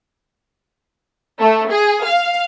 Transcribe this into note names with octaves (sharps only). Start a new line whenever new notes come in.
A3
G#4
F5